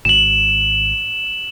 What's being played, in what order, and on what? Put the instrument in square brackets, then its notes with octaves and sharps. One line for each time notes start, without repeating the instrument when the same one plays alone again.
[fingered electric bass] G#1 [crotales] E7 F#7